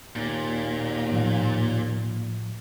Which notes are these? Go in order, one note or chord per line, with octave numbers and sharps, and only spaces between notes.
D#2 A#2
A2 F3